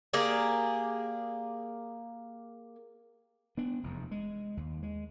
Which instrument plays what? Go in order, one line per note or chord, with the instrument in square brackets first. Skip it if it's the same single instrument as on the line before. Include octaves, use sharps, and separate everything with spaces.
[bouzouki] A#3 G4 G#4 D5
[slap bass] B3 D4
F1 E2
G#3
D#2
G#3